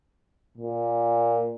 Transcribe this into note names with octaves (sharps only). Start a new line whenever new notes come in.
A#2